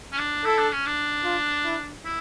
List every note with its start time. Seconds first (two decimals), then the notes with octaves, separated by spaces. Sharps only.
0.12 C#4
0.18 D4
0.45 E4 A4
0.58 D4
0.72 C#4
0.86 D4
1.24 F4
1.64 E4
2.05 E4